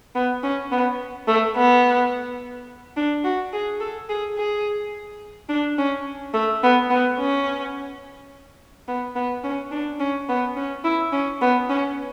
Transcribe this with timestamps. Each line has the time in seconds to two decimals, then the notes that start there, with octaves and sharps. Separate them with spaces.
0.15 B3
0.43 C#4
0.72 B3
1.28 A3
1.56 B3
2.97 D4
3.24 F#4
3.53 G#4
3.80 A4
4.09 G#4
4.38 G#4
5.49 D4
5.78 C#4
6.34 A3
6.63 B3
6.90 B3
7.19 C#4
8.88 B3
9.15 B3
9.44 C#4
9.71 D4
10.00 C#4
10.29 B3
10.56 C#4
10.84 E4
11.13 C#4
11.41 B3
11.69 C#4